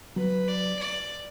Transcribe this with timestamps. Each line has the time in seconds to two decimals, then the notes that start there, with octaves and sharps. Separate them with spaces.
0.16 F#3 B4
0.48 D5
0.79 D5